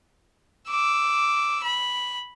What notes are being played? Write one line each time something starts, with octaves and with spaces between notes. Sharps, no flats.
D6 E6
B5